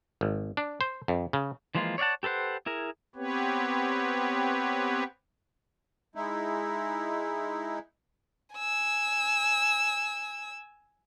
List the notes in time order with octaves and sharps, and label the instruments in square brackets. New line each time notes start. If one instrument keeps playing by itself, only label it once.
[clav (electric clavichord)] G#1
D4
C5
F2
C#3
[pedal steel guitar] E3 F3 G#3 A#3 F4
C#5 D5 E5 F#5 A5
G4 A4 B4 C5 F#5
E4 G#4 A#4
[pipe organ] B3 C4 G4 B4 C#5
[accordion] G#3 D#4 E4
[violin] G#5 E6